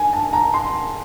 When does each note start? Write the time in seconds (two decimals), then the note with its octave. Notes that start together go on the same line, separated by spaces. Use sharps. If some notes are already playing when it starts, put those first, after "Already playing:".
Already playing: G#5
0.13 A5
0.33 A#5
0.54 C6